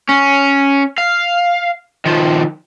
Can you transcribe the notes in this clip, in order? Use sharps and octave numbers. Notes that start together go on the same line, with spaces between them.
C#4
F5
D#3 F3